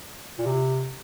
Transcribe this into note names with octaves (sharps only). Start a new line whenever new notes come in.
A#2
C3